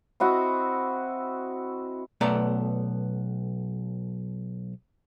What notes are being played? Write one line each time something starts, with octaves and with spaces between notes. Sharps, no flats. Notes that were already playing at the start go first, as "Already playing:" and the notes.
C4 E4 F#4 D#5
B1 A3 B3 D5 A#5